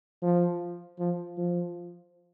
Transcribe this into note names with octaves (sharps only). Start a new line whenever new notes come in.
F3
F3
F3